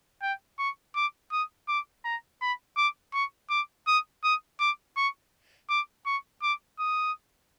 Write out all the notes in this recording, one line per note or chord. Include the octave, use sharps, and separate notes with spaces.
G5
C#6
D6
D#6
D6
A#5
B5
D6
C#6
D6
D#6
D#6
D6
C#6
D6
C#6
D6
D#6